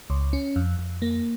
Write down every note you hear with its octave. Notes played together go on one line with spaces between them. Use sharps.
C#2
C#4
F2
F2
A#3